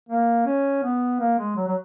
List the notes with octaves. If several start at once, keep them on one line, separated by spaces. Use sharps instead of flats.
A#3
C#4
B3
A#3
G#3
F#3
F#3